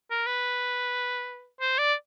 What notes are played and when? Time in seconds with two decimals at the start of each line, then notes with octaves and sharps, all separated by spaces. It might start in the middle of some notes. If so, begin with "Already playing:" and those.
0.11 A#4
0.26 B4
1.61 C5
1.79 D5